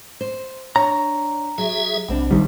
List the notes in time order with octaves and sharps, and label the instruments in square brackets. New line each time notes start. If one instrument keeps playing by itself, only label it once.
[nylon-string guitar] C5
[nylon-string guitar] D4 C#5 [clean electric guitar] A#5
[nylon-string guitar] F#3 [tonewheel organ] G#4 E5
[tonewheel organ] B1 [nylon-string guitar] C3 C4 D4
[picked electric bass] D#3 G3